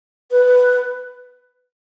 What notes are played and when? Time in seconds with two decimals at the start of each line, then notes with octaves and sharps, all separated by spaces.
0.31 B4